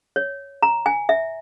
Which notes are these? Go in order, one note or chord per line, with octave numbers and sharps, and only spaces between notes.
C#5
A#5
G#5
E5